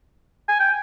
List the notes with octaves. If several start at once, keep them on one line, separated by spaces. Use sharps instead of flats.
G#5
G5